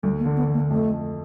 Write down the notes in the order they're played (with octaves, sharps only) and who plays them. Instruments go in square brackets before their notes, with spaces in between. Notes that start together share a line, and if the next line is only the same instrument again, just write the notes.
[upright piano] D2 [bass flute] G3
[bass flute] A#3
[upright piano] D3
[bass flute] B3
[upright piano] D3
[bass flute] A#3
[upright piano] F2 [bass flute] A3
[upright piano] A3